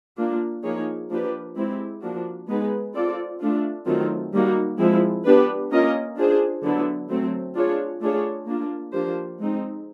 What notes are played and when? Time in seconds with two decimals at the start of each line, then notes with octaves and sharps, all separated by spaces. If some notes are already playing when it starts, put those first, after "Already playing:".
0.17 A#3 D4 F4
0.63 F3 A#3 D#4 G#4 C#5
1.10 F3 A#3 D4 G4 B4
1.55 G#3 C4 E4 G4
2.02 F3 A#3 D4 F#4
2.48 G#3 B3 D#4 G#4 B4
2.94 C4 F4 A4 D5
3.40 A3 D4 F4
3.86 D#3 F#3 A3 C4 F4
4.32 D#3 G3 A#3 D#4 F#4
4.78 F3 G#3 C4 E4
5.25 B3 D4 G4 B4
5.70 A#3 C#4 F4 A#4 D#5
6.16 D4 F4 G#4 C5
6.63 D3 F#3 B3 E4
7.09 F#3 A3 C4
7.55 D4 F4 G#4 C#5
8.01 A3 D4 F4 G#4 C#5
8.47 A#3 D4 F4
8.93 F3 A#3 D4 G4 C5
9.40 G#3 C4 D#4